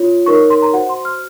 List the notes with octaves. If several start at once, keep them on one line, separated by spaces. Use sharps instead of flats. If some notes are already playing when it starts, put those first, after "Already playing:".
Already playing: F4 C#5
D#4 A#4 C#5 C#6
C6
A#5
F#4 C5 F#5
C6
F6